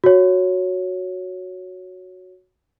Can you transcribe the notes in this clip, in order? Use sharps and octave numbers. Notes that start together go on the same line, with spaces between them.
F#4 C#5